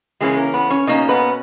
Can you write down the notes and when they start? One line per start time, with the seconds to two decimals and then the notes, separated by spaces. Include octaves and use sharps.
0.21 C#3 E3 G#3 A#3 C#4 G#4
0.37 A#3 A#4
0.54 B3 B4
0.70 C#4 C#5
0.87 B2 A#3 C#4 D#4 D#5
1.09 B3 B4